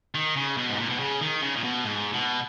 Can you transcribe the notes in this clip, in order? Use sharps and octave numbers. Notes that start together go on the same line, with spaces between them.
D#3
C#3
B2
G#2
A#2
B2
C#3
D#3
C#3
A#2
B2
G#2
B2